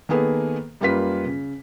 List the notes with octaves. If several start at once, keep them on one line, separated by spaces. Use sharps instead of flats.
D#3 A#3 B3 G#4 A4 B4
F#2 G3 A#3 F4 B4 B6
C#3